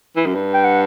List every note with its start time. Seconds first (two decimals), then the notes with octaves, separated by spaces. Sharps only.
0.16 E3
0.26 F#2
0.35 G2
0.54 G5
0.64 F#5